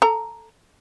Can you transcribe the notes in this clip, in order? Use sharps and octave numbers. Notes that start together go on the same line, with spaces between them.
A4 A#5